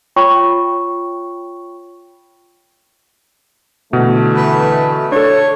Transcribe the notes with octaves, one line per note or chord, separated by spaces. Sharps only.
F4 C#5 G5 B5 C#6
B2 D3 E3 A3
B4
D4 A4 C#5